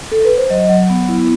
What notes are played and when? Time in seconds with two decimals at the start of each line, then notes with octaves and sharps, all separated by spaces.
0.12 A4
0.25 B4
0.38 C5
0.50 F#3 D#5
0.69 F#3
0.90 B3
1.08 E4